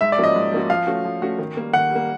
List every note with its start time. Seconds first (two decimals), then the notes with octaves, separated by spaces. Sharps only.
0.01 G#2 E5
0.12 D5
0.18 F3 A#3 C#4 F#4
0.24 D#5
0.36 G#2
0.52 F3 A#3 C#4 F#4
0.70 F3 F5
0.87 A3 C#4 F#4
1.04 F3
1.22 A3 C#4 F#4
1.38 D#3
1.56 G3 A#3
1.73 D#3 F#5
1.90 G3 A#3